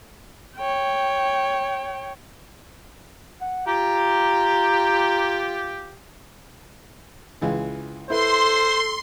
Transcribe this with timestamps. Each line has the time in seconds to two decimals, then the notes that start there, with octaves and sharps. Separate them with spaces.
0.57 C#5 G5
3.41 F#5
3.66 F4 G4 A#5
7.41 C#2 E3 G#3
8.10 E4 A4 B4 C5 C6